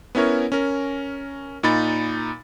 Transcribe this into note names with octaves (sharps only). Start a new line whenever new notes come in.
B3 C#4 E4 A#4 C#5
C#4 A#4
A#2 D#4 B5 A6